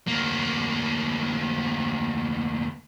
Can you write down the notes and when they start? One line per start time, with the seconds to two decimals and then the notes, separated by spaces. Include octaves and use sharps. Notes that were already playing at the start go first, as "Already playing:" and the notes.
0.07 D2 A#3